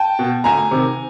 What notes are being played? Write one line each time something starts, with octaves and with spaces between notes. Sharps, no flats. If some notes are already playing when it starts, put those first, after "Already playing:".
Already playing: G5 A5
B2
D2 G#5 A#5
C3 D#3